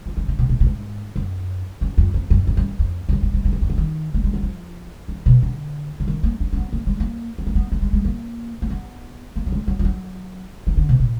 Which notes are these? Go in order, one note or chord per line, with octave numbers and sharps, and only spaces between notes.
F3
D#3
D3
B2
A#2
A#2
G#2
F#2
F#2
F2
F2
F#2
F2
F#2
F#2
F2
F2
F#2
G#2
G#2
G#2
F#2
F2
D3
D#3
A#3
G#3
F#3
F3
D#3
B2
D3
D3
D#3
A#3
D4
D4
B3
A#3
G#3
A#3
B3
A#3
B3
A#3
G#3
G#3
A#3
A#3
B3
A#3
F#3
G#3
F#3
F3
F#3
F3
D3
B2
A#2